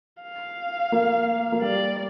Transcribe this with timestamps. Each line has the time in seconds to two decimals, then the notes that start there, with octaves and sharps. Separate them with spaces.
0.23 F5
0.92 A#3
1.52 A#3
1.62 G3 D5